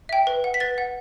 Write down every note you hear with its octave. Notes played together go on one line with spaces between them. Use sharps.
E5 G5
B4
F#5
B6
B4 A6
F#5